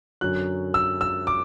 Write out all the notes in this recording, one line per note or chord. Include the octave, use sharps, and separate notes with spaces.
F#2 D3 F#3 F#6
E6
E6
D6